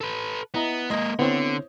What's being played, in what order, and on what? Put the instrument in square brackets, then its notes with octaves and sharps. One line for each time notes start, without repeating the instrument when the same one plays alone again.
[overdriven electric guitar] A4 B4
[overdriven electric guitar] B3 [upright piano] E4 D#5 A#5
[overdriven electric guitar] G#3 A#3 [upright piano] D#5
[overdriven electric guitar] D3 [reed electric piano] B3 C4 [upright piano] E4 C5 C#5